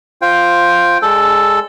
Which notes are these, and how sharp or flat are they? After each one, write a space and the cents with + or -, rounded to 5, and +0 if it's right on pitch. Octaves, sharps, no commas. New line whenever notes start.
F4 +0 C5 +0 G5 +0
G#3 -15 D4 -35 A4 +0